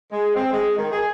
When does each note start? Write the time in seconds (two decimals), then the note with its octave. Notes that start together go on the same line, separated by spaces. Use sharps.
0.12 G#3
0.35 C4
0.52 G#3
0.77 D#3
0.92 G#4